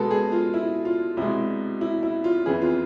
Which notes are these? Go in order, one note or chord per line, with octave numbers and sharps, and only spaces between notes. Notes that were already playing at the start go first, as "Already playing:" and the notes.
Already playing: B2 G#3 B3 A4
G#4
F4
E4
F4
C2 B2 G#3 E4
E4
E4
F4
F2 E3 B3 G#4
F4